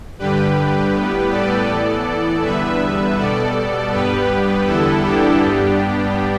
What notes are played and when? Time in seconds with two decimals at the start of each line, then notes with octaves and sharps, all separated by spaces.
0.19 G2 D3 G3 G4 B4
0.94 A2 G3 B3
1.30 A4 D5
1.68 A2 E3 B3
2.42 E2 D3 G3 B3 B4 E5
3.17 B2 G3 B3 A4 D5
3.91 G2 G3 B3 G4 B4
4.65 E2 D3 G3 B3 E4 A4
5.03 D4 G4
5.40 G2 G3 B3